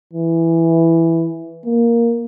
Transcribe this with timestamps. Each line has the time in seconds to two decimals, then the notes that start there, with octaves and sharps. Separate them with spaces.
0.13 E3
1.66 A#3